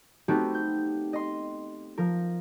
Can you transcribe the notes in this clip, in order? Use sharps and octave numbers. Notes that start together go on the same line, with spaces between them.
A3 B3 C4 D#4 F#4 G4
G6
D#5 C6
F3 A#4